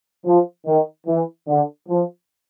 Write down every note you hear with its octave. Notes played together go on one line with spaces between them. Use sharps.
F3
D#3
E3
D3
F3